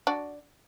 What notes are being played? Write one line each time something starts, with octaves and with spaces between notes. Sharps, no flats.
D4 F#4